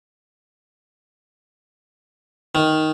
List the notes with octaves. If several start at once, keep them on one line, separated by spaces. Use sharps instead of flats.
D#3